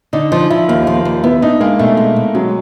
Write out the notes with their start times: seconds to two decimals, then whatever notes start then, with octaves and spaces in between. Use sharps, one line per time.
0.13 D3 D#4
0.32 F3 D#4
0.50 F3 E4
0.68 D#2 A#3
0.83 F3 A#3
0.97 A#3
1.05 D#2
1.23 B3 E4
1.42 D4 D#4
1.60 G#3 A#3
1.79 B2 A3
1.97 G#3
2.16 B2
2.35 F#3 G#3